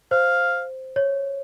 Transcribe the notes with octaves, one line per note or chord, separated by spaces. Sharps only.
C5 F5
C#5